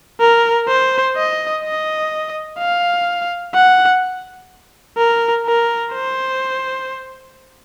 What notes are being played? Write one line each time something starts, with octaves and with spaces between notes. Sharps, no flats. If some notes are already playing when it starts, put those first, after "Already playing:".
A#4
C5
D#5
D#5
F5
F#5
A#4
A#4
C5